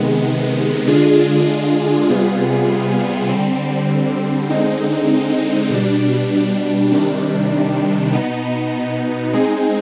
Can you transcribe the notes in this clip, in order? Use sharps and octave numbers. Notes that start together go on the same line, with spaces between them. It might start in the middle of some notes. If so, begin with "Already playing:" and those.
Already playing: C3 D#3 G#3 B3
D3 G#3 D4 F4 G#4
C3 G3 B3 F4 G#4
D3 G3 C4
D3 G#3 C4 D#4
B2 G3 D4
C3 D#3 G3 D4
B2 B3 D#4
G#3 C4 D#4 G#4